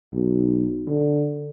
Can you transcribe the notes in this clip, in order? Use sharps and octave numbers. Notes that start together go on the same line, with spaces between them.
B1
D3